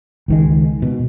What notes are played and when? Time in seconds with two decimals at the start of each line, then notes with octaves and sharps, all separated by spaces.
0.28 C#2 D#3 G#3
0.82 B2